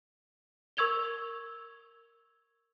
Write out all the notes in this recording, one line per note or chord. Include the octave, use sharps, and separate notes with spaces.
A#4 C#6 E6 G#6 F7 G7